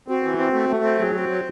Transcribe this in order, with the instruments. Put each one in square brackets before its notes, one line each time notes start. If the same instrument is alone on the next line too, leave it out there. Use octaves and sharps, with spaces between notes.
[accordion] C4 [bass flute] F#4
[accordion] E3
C4
A3
A3
C4
[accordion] F#3 [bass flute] G#4
[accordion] C4 [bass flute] F#4
[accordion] F#3